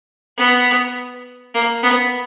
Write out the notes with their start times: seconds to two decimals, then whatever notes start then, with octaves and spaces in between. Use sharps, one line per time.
0.37 B3
1.54 A#3
1.83 B3